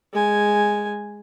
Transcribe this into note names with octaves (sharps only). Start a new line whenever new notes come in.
G#3 G#5